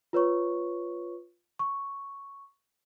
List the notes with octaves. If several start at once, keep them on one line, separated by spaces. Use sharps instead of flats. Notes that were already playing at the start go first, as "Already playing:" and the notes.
F4 B4 C#5 C#6
C#6